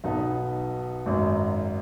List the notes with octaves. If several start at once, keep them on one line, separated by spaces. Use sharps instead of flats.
B1 B2 B3 D#4
G#1 F#2 F#3